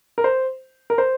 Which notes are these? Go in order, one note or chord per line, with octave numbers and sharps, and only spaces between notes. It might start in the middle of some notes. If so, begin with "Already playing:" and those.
A#4
C5
A#4
C5